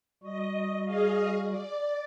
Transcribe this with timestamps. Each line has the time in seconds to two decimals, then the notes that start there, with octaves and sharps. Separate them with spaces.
0.23 G3 F#4 D#5
0.85 G#4 D#5 F5
1.49 D5